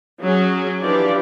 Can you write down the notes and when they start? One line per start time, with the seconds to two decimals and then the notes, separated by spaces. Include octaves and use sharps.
0.24 F#3 C#4 G#4
0.80 E3 F3 D4 G4 D5